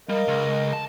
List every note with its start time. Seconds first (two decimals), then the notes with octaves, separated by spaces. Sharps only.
0.09 G3 A#4 D#5 F5
0.28 C#2
0.73 A5